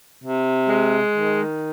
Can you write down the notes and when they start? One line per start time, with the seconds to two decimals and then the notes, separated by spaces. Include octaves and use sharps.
0.23 C3
0.69 G#3
1.15 D#3